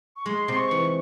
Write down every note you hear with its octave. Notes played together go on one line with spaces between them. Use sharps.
C#6
G#3 C6
C3 C6
C#6
E3